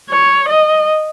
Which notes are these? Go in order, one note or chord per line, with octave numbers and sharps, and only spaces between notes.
C#5
D#5